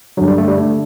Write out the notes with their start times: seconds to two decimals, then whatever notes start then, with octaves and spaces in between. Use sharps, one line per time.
0.17 G2 D3 F#3
0.27 G3
0.38 A3
0.48 G3
0.57 D3 A3